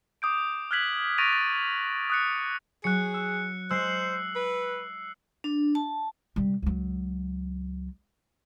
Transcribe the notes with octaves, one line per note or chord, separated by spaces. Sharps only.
D6 D#6 G6 D7
F6 F#6 G#6 B6 F#7
C#6 A6 A#6 D7 D#7 F7
A6
D#6 F#6 C#7
F#3 G#4 F#6 C#7
E6
G#3 C5 E6 C7
B4
D4
A5
C3 G3
C#2 F#3